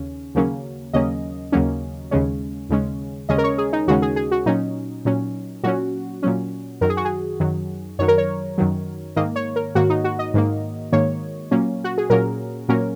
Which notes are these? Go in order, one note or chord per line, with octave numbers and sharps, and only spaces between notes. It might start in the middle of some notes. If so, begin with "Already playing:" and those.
Already playing: D#2 C#3 C#4
D#2 C#3 F#3 A#3 C#4
D#2 C#3 F#3 A#3 C#4 D#5
D#2 C#3 F#3 A#3 C#4
D#2 C#3 G#3 C#4
D#2 C#3 G#3 C#4
D#2 C#3 G#3 C#4 D#5
A#4
C#5
G#4
D#4
D#2 C#3 G#3 C#4 F#4
G#4
G#4
F#4
A#2 F#3 C#4 D#4
A#2 F#3 C#4
A#2 F#3 C#4 F#4
A#2 F#3 C#4
F#2 D#3 F#3 A#4
G#4
F#4
G#4
F#2 D#3 F#3
F#2 D#3 F#3 C#5
A#4
C#5
F#2 D#3 F#3
G#2 D#3 A#3 D#5
C#5
A#4
G#2 D#3 A#3 F#4
D#4
F#4
D#5
G#2 D#3 A#3
G#2 D#3 A#3 C#5
A#2 F#3 A#3 C#4
F#4
G#4
A#2 F#3 A#3 C#4 A#4
A#2 F#3 A#3 C#4 A#4